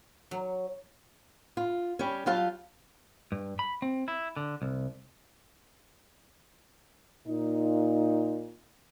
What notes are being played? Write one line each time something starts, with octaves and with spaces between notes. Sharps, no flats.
F#3
F4
G3 C#4
F#3 G3 F4 F5 A5
G2
B5
C4
E4
D3
C2
A#2 D#4